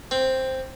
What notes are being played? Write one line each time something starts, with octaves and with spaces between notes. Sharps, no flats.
C4